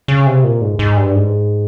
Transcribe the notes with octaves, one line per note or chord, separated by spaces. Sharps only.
C#3
C3
A#2
G#2
G#2
G2
G#2